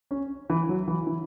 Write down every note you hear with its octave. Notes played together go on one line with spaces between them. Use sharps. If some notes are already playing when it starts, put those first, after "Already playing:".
C#4
E3
F#3
E3
E3